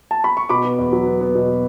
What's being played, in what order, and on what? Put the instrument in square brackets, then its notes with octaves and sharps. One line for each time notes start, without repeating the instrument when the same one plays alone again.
[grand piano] A5
B5
C#6
B2 B5 D6
B3
E2
F#3
B3
B3
B2